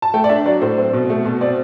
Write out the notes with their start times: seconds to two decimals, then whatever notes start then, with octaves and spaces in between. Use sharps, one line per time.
0.02 A5
0.14 A3 G5
0.24 D5
0.29 D4 E5
0.46 F#3 D5
0.61 A2 C5
0.78 C4
0.93 B2
1.10 A3
1.25 B2
1.41 C4 D5